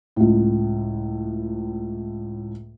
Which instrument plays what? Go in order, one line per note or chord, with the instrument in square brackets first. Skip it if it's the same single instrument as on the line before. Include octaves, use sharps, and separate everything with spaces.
[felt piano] C#2 A2